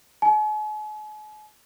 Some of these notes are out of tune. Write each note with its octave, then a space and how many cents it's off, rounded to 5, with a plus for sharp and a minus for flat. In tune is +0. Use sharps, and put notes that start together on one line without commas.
G#5 +45